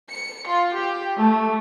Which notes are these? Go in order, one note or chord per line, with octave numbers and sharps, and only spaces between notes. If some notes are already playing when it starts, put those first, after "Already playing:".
C#7
F4
G4
A3